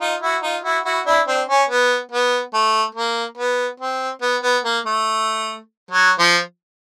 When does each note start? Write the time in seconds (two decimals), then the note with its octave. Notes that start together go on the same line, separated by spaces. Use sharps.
0.01 D#4 F4
0.22 E4 F#4
0.42 D#4 F4
0.64 E4 F#4
0.85 E4 F#4
1.06 D4 E4
1.27 C4 D4
1.49 C#4
1.69 B3
2.11 B3
2.54 A3
2.95 A#3
3.38 B3
3.80 C4
4.22 B3
4.43 B3
4.64 A#3
4.85 A3
5.91 F#3
6.19 F3